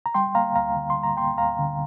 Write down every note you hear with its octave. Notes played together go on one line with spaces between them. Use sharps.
A#5
G3 G5 C6
A#3 F5 A#5
D2 F5 A#5
D3
C6
G3
A#5
A#3 G5 C6
D2 F5 A#5
D3